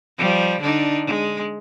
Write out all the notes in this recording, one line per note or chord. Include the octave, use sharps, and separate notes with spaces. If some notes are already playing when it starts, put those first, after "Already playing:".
F3 G3
D3 D4 D#4
G#3